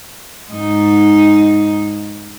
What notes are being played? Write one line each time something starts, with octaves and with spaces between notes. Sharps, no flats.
G#2 D#4